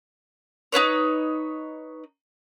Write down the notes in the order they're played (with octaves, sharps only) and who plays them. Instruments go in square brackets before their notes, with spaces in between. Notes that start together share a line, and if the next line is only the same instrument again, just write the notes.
[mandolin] D#4 E4 B4 C#5